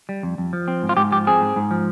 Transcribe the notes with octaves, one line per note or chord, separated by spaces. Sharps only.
G3
F2
F2
F3
C4
G#2
F4
G#2 G4
F3 G4
C4 G#4
G#2
G#2
F3